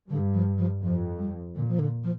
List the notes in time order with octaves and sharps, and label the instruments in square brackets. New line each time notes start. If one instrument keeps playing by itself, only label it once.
[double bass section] G2 [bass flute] D3
[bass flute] F3
F3
[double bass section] F2 [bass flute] F3
[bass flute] G3
[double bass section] A#2 [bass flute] D3
[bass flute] F3
D3
F3